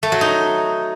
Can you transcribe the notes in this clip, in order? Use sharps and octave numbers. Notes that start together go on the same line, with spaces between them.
A3
F#3
D#4